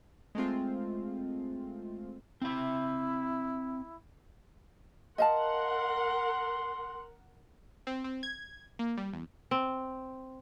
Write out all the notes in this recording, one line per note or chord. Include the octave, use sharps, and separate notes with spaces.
G#3 A3 C4 F4
C4 E4 E5
A#4 D#5 F5 F#5 A5 C6
C4
C4
G#6
A#3
G3
E2
C4